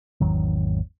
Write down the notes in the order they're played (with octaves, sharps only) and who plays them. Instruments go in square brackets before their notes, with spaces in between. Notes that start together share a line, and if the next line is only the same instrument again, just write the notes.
[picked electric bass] G#1 E2 D#3 F#3